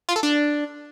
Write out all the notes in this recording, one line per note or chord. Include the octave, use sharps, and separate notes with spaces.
F4
A4
D4